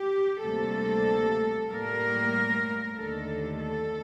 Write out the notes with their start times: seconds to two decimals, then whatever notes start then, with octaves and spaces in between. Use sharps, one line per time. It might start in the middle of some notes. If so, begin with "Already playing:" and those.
Already playing: G4
0.44 D2 C3 G3 A#3 A4
1.70 A2 G3 A#3 A#4
2.96 D#2 D3 A3 A4
3.59 A4